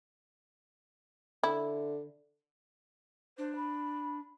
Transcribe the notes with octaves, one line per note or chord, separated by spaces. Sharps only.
D3 E4
D4 C5
B5